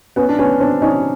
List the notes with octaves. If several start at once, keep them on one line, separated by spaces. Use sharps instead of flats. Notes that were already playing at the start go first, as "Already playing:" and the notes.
B3 C#4
D4
B3 C#4
C4 D4
C#4 D#4